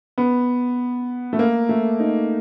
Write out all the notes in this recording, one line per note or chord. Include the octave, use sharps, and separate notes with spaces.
B3
A3
A#3
A3
D#4